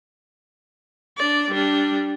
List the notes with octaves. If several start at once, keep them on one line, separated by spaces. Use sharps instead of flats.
D4 D5
G3 D4